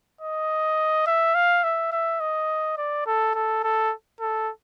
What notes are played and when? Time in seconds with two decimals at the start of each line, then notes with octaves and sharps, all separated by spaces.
0.21 D#5
1.07 E5
1.35 F5
1.64 E5
1.92 E5
2.20 D#5
2.78 D5
3.06 A4
3.35 A4
3.64 A4
4.21 A4